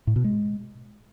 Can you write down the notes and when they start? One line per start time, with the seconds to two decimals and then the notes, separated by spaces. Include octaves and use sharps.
0.07 A2
0.16 B2
0.24 G#3